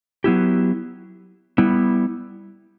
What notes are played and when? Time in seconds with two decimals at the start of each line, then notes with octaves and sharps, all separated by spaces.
0.24 F#3 B3 E4 G4
1.58 G3 B3 E4